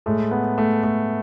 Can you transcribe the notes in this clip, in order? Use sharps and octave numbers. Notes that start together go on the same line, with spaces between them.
A2 G#3 A3
B3
A3
A3